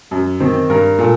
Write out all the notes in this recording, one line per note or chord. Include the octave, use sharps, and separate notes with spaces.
F#2
D#3 C4
G2 A#4
A#2 A4